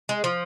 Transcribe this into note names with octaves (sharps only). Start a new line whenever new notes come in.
G#3
F3